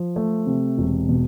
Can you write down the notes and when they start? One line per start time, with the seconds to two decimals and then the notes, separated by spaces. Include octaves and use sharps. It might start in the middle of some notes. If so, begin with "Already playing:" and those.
Already playing: F3
0.16 A3
0.47 C3
0.78 E1
1.09 B2